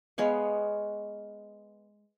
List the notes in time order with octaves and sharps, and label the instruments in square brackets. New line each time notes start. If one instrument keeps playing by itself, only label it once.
[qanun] G#3 B3 C#5 F5